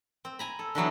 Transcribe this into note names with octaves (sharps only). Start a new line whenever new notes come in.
C4
G#5 A#5 B5
A4
D3 E3 F#3 B3